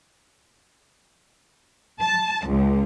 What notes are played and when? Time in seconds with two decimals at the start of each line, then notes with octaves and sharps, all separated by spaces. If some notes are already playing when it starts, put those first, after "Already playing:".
2.03 A5
2.49 C#2